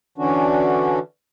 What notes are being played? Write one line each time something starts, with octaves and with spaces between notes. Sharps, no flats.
D3 E3 C#4 D4 F#4